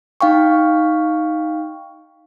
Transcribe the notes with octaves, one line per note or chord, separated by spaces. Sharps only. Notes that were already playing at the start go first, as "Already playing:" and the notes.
D#4 F5 G5 C#6